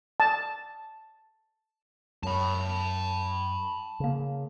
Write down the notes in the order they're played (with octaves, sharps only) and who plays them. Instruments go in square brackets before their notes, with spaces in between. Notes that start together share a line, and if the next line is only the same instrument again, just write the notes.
[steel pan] A5
[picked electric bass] F#2 [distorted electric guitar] A5 B5
[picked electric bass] C#3 A#3